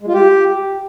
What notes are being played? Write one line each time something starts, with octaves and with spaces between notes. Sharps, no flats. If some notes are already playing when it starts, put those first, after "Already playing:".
G#3
F4
G4